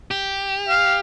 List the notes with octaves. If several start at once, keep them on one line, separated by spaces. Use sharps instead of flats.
G4
F5